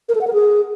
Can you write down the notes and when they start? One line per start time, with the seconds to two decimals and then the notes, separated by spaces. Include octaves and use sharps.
0.09 A#4
0.15 A4
0.21 F#5
0.27 A#4
0.33 G#4